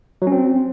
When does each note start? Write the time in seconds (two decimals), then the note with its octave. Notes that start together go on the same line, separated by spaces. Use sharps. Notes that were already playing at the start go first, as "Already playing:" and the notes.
0.22 F#3
0.27 C#4
0.32 C4